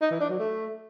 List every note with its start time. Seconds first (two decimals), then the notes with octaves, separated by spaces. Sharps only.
0.01 D#4
0.11 E3
0.20 D4
0.30 F#3
0.39 A3